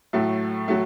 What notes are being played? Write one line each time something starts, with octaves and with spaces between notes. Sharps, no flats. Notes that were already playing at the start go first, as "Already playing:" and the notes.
A2 F#3 A3
F#3 A3